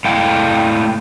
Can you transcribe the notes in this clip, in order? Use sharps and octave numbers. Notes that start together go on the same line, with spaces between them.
A2 F5 G5